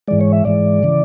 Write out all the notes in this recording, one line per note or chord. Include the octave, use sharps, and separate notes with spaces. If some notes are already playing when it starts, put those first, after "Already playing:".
G#2 E3 G#3 D5
C#5
E5
G#2 E3 G#3 D5
C#3 E3